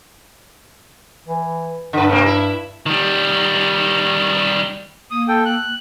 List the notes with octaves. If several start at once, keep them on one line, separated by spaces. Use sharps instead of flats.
E3
G2 D3 B4
C3 A#3
E4
D#3 G3
A#3 D#6
A4 G5
F#6